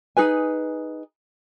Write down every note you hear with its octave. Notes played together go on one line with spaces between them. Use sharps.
D#4 G#4 B4 G#5